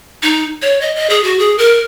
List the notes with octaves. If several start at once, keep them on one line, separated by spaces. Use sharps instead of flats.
D#4
C#5
D#5
D#5
G#4
F#4
G#4
A#4